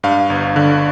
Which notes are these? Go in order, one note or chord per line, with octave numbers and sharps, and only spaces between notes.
G2 F5
G1
D3